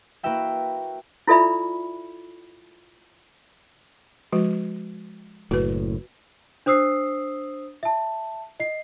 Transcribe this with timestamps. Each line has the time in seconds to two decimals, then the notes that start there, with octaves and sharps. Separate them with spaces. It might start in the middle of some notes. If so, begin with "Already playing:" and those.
0.23 A#3 E4 F#4 B4 E5 G5
1.28 E4 F4 A4 D5 E5 B5
4.32 F3 G#3 F#4
5.51 F#1 A2 F#4 B4
6.66 D4 C5 D#6 E6 C7
7.83 E5 A5
8.60 D#5 C7